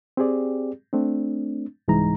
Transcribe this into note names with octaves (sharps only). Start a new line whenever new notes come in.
C4 G4 G#4 D5
A3 C4 D4
C2 G#2 E3 G#3 D#4 A#5